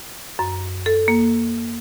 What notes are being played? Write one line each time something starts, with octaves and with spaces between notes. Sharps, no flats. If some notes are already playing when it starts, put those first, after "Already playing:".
F#2
A4
A#3